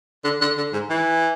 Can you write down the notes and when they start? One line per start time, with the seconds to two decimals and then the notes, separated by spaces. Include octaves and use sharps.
0.24 D3
0.41 D3
0.57 D3
0.73 G#2
0.90 E3